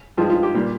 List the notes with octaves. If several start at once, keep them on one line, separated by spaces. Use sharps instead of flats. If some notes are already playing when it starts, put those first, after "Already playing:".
G2 F3 G#3 F4
F4
G4
A#2 G3